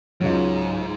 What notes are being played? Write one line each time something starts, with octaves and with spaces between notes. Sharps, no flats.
C#2 G#2 C#3 F#3